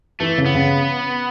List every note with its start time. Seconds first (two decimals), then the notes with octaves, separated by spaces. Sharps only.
0.20 E3 A3
0.38 C#3
0.46 B3
0.55 C#3